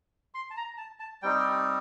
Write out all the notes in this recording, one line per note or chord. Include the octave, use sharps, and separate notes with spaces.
C6
A5
A#5
A5
A5
G3 C4 D#4 G5